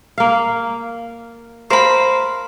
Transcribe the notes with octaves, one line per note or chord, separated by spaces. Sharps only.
A#3 F5
A#4 C5 F5 B5